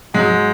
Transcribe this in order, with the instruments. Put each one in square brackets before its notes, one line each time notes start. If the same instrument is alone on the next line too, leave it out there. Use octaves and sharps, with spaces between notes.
[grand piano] G#2 F#3 G#3